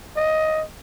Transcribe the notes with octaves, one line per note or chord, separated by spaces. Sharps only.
D#5